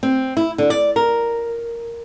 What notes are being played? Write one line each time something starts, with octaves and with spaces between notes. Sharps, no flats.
C4
E4
D3
D5
A#4